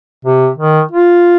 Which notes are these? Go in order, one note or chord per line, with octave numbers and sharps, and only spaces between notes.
C3
D#3
F4